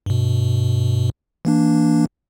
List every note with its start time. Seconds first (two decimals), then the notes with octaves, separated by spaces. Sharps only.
0.06 G2 B2
1.45 E3 A#3 D4